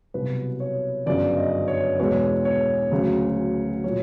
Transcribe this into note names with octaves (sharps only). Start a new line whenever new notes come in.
C2 B2 F#3 B4
C#5
G1 F#2 C#3 D5
D#5
C#5
E2 B2 G#3 C#5
C#5
D2 C#3 F#3
A#2 F#3 C#5